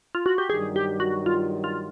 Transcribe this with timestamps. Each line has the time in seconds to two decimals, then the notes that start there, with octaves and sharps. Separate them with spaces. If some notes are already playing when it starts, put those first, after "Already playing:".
0.15 F4
0.26 F#4
0.38 G4
0.50 G2 D#3 F#3 G#4
0.76 G4
1.00 F#4
1.26 F4
1.64 F4